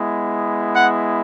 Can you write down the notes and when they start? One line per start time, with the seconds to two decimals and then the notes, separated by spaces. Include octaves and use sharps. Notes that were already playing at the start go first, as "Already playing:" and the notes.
Already playing: G#3 B3 E4
0.76 F#5